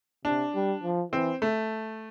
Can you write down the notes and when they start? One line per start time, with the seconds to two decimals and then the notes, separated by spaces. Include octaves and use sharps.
0.25 C3 D4
0.54 G3
0.83 F3
1.12 E3 C4
1.42 A3